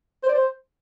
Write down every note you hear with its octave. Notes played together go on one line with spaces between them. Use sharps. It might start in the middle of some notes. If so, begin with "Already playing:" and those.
C5
D5
C5